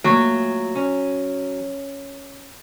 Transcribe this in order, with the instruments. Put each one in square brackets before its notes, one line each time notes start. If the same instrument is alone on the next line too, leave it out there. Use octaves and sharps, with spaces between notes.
[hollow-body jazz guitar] A#2 A3 [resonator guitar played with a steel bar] F#3
[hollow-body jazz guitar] C#4